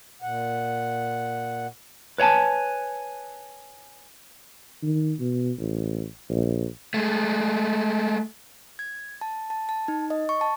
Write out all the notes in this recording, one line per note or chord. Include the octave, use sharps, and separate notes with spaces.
A#2 F#5
B4 C#5 D5 G#5 A5
D#3
B2
A1
A#1
G#3 A3
G#6
A5
A5
A5
D#4
D#5
C#6
A5